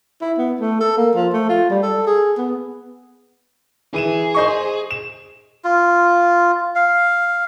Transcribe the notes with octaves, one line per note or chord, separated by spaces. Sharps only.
E4
B3
A3
A4
A#3
F3
A3
F4
G3
A4
G#4
B3
E3 G#4 D#7 E7
C5 D#5 C#6
E7
F4
F5